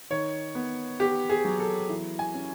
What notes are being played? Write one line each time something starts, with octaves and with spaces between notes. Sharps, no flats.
D#3 C#5
B3
B3 G4
G#4
F#3
A4
E3
G#5
C#4